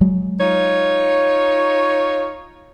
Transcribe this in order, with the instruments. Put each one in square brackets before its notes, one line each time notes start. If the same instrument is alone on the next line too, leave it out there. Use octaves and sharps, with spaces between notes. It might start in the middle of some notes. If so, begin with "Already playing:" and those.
[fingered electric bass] F#3 G#3
[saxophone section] D#4 F4 C#5